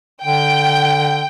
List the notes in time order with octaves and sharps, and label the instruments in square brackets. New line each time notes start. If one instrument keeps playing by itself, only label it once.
[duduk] D3 [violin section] G5